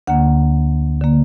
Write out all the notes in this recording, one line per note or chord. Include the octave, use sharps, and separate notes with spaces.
D2 D3 A#3 F#5
D3 A#3